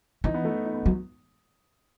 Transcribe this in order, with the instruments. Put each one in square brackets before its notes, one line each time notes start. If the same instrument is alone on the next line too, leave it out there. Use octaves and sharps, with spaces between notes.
[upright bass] E3 [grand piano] D#4
[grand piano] B3
A3
D#4
B3
[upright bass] F#3